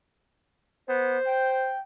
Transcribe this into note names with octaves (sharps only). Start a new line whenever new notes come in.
B3 C5
G5